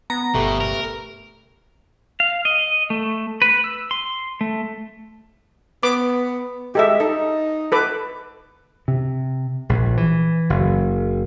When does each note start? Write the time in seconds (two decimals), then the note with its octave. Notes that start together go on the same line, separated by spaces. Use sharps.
0.10 B3 A#5
0.35 G1 B2 A3 G4 B4
0.60 A#4
2.20 F5
2.45 D#5
2.90 A3
3.42 B4
3.64 E6
3.91 C6
4.41 A3
5.83 B3 D6
6.75 G#3 G4 A4 E5
7.00 D#4 A4
7.72 A4 B4 D6
8.88 C3
9.69 A#1
9.97 E3
10.50 F#1